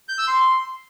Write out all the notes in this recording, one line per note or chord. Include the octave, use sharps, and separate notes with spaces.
G6
E6
C6